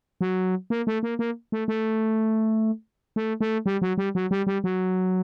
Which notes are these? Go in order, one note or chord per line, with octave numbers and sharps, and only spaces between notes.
F#3
A#3
A3
A#3
A#3
A3
A3
A3
A3
G3
F#3
G3
F#3
G3
G3
F#3